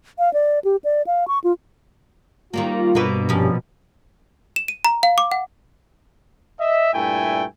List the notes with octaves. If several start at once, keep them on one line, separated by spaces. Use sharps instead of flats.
F5
D5
G4
D5
F5
C#6
F4
D#3 G3 A#3 F4
G2 B2 A#3 B4
A#2 F3 C#4 D4 G4
E7
D#7
A#5
F5
D6
F#5
D#5 E5
G2 A#2 A3 E4 G5 G#5